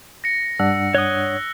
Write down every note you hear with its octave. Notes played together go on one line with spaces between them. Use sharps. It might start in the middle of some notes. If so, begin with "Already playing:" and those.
A#6 C#7
G2 D4 F#5 E6
C#5 D#6 F#6 C#7 G7